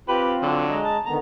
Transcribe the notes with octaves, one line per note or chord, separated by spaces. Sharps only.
C4 F4 G4 B4
D3 F#3
G#3 D#5 A#5
A5
D3 D#3 B3 A#5